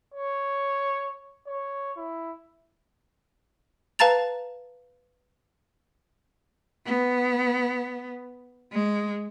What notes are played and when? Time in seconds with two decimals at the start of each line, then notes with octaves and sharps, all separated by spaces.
0.14 C#5
1.47 C#5
1.97 E4
3.99 B4 F5 A5 A#5 A6 F7
6.86 B3
8.72 G#3